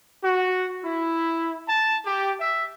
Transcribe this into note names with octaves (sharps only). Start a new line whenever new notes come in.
F#4
E4
A5
G4
E5